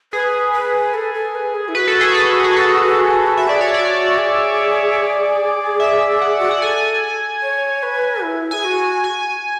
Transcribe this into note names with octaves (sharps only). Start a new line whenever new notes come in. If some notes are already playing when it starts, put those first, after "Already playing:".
G#4 B4
B4
A4
A4
B4
G#4
E4
F#4 B4
A4
G#4
A4
G#4
A4
F#4 E5
G#4 D5
F#4 C#5
F#4 D5
G#4
E5
F#5
F#4
G#4 F#5
A4 G#5
C#5
B4
E4
G#4 G#5
F#4
G#5